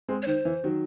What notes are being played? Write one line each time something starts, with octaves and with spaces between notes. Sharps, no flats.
G#3 C4
C#5
D#3 C5
E3
D#3 F#3